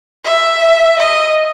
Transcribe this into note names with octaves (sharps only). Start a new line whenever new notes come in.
E5
D#5